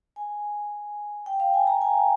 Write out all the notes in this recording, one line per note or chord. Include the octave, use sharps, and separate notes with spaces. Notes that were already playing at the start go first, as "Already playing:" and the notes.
G#5
G5
F5
G#5
A#5
G#5